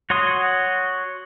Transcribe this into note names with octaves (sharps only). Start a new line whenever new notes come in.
F#4 C#5 C6 D#6